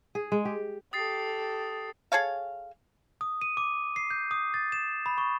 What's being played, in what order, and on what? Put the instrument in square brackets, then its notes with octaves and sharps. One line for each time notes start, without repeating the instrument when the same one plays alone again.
[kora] G#4
G#3
G4
[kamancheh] G4 A4 [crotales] D#6 A6 C7
[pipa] G#4 A4 C#5 F5
[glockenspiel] D#6
D#7
D6
C7
G6
D#6
A6
E7
B5
C#6